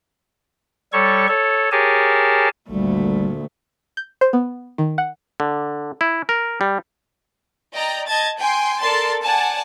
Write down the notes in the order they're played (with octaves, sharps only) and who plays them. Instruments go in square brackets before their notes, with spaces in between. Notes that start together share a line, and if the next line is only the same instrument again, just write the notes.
[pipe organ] G3 A4 C#5 C#6
A4 C#5
G4 G#4 A#4 C#5 G#5 A5
[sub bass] G#1 [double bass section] D2 [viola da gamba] A#2 A3 [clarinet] G3
[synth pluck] G6
C5
B3
D#3
F#5
[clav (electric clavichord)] D3
E4
A#4
G3
[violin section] D5 D#5 G5 A#5
D#5 A5 G#6 A6
G5 G#5 C6
A4 A#4 D5 A5 C6 A6
D5 F#5 G#5 A5